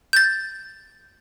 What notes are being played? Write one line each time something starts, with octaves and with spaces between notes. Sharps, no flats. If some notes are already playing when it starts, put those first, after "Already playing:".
G6 A6